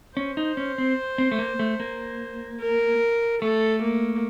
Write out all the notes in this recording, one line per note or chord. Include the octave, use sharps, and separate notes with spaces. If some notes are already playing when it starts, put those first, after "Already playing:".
C#4 C5
D#4
C#4
C4
C4
A3
A#3
A3
A#3
A#4
A3 A4
A#3